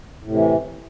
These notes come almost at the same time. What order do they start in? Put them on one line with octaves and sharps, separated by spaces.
A2 C3 E3